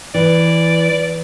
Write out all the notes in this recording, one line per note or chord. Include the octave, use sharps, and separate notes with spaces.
E3 D5